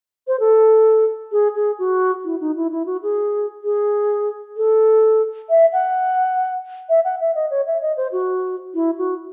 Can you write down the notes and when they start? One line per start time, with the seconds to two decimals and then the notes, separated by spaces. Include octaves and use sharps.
0.28 C5
0.40 A4
1.32 G#4
1.55 G#4
1.79 F#4
2.25 E4
2.41 D#4
2.56 E4
2.72 E4
2.86 F#4
3.03 G#4
3.64 G#4
4.57 A4
5.50 E5
5.73 F#5
6.89 E5
7.05 F#5
7.21 E5
7.35 D#5
7.51 C#5
7.67 E5
7.82 D#5
7.97 C5
8.12 F#4
8.74 E4
8.98 F#4